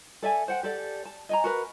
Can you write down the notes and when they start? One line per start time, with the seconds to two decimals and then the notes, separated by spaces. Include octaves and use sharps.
0.23 A4 D5 E5 G#5
0.48 C5 F#5 G5
0.63 G4 A4 D5
1.05 A5
1.29 D#5 G#5 A#5
1.44 F#4 A#4 B4